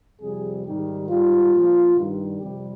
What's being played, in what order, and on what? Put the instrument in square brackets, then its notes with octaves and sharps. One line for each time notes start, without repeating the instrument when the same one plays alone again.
[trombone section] F2 C3 G3 G#4
G#2 D#3 G3 G4
G#2 G3 F4
A#2 F3
G2 D#3 G3
F2 C3 G3 G4